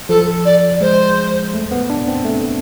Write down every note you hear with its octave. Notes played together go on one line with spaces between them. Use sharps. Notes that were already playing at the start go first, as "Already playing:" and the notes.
F3 A4
D5
G#3 C5
A3
B3
D4
C4
A3